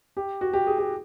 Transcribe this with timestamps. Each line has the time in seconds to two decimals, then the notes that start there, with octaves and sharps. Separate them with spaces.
0.17 G4
0.41 F#4
0.53 G4
0.67 G#4
0.78 G4